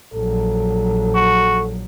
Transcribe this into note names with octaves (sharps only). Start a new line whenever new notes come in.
A#1 F#3 A4
F#4